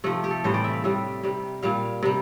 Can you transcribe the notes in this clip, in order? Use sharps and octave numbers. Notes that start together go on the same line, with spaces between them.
C3 F3 A3
G4
A4
A2 E3 G3 C5
D5
E5
F5
A2 G3 E5
C3 G3
A#2 G3 F5
C3 G3